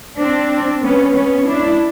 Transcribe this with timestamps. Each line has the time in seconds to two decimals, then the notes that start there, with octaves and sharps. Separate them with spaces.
0.20 C4 D4
0.83 B3 C#4
1.15 B3 C#4
1.47 D4 E4